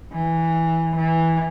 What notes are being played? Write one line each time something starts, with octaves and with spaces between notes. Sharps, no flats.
E3
E3